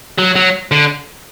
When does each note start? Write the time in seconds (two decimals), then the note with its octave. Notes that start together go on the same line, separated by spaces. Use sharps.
0.19 F#3
0.36 F#3
0.72 D3